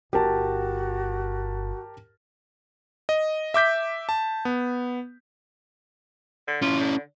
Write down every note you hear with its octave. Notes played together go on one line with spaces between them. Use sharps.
G1 F#4 G4 A#4 A5
D#5
E5 D6 G6 B6
A5
B3
D3
C#4 E4 F4
D3